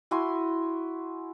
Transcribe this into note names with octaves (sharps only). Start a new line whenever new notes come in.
E4 F#4 G#5 C6